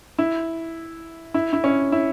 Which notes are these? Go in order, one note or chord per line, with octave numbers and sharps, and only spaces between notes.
E4
E4
E4
C#4
E4